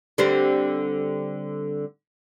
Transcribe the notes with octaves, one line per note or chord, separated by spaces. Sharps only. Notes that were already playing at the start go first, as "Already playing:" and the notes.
D3 G3 C4